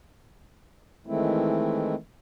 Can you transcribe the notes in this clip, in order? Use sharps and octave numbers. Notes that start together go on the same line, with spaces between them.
D#3 E3 G#3 A3 C4 E4